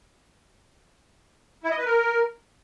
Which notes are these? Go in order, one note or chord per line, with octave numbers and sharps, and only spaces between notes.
E4
D#5
B4
A#4